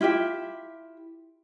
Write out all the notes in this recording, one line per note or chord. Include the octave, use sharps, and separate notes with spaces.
E4 F4 G4 E5